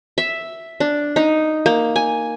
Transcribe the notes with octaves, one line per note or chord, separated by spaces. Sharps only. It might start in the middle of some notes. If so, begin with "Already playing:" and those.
E5
D4
D#4
A#3
G#5